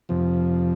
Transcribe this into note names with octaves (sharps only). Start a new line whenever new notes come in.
F2 C3 F3